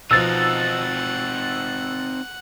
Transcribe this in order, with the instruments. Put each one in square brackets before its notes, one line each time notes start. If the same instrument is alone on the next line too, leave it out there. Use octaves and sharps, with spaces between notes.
[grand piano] B2 F3 [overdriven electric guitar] C4 D#4 [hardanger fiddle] F#5 [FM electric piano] E6 A6